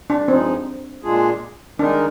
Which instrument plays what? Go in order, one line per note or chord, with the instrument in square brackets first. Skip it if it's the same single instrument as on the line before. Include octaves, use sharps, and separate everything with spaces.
[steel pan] D4
[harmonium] G2 F3 G#3 D#4 [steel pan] C4
[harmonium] A#2 G#3 D4 F4 G#4
[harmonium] D#3 G#3 D#4 A#4 [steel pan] D4